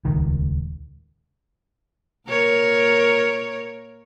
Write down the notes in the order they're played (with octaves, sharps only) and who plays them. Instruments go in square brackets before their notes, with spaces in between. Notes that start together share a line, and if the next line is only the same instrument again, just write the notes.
[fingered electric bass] D#1 C#2 D#3
[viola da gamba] A#2 A#4 C#5